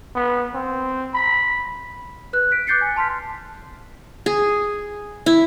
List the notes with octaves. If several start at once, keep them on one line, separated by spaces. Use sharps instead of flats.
B3
C4
B5
B4 F#6
B6 D7
D6 F#6 G6 A6 C7 C#7
G#5
A5 C6 F6 B6
G#4
E4